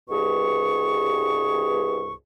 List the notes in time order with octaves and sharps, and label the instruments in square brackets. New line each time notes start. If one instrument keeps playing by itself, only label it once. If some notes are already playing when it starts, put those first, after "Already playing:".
[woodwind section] C2 G2 B2 G#4 C#6